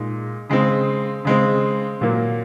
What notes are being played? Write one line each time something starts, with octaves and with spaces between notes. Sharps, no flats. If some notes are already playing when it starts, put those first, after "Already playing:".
Already playing: A#2 G#3 D#4
C#3 G#3 C4
C#3 G#3 C4
A#2 F#3 A#3